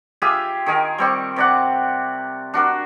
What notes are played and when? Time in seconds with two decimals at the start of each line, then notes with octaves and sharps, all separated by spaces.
0.22 F4 G4 G#4 E5
0.66 D#3 G#4 A#4
0.98 G3 C4 C#6
1.36 C3 D5 F#5
2.54 D4 F#4 A#4